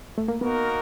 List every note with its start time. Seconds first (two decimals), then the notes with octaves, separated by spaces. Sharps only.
0.18 A3
0.28 A#3
0.41 A#3 B3 D#4 F#4 A#4